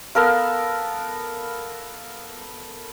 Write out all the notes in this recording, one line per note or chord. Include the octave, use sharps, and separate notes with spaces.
B3 A4 A#4 F5